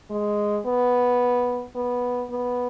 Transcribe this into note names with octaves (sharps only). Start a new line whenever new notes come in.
G#3
B3
B3
B3